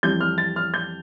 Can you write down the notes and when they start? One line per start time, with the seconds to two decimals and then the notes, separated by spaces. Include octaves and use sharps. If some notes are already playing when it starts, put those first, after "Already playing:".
0.03 F2 E3 G3 G6
0.21 F6
0.38 A6
0.56 F6
0.74 G6